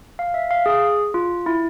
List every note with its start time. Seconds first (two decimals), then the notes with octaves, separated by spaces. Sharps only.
0.19 F5
0.34 E5
0.51 F5
0.66 G#4
1.14 F4
1.46 E4